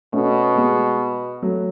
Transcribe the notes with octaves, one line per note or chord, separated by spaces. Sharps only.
B2 A3 C#4
G#3 B3
F#3 A3